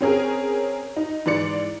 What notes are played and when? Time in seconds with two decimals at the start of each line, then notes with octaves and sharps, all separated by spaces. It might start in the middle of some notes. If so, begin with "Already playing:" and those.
0.01 C4 C#4 G#4 A#4
0.96 D#4
1.26 G#2 E3 D5 C#7